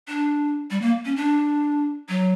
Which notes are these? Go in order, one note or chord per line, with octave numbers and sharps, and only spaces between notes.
D4
G3
A#3
C#4
D4
F#3